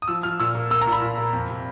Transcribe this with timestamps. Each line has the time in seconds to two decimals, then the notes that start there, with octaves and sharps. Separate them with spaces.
0.02 D#6
0.08 F3 E6
0.23 F3 F6
0.40 A#2 E6
0.55 A#3
0.70 A#3 E6
0.81 A#5
0.87 A#2
0.92 B5
1.02 A#2
1.17 A#3
1.33 F2
1.49 C3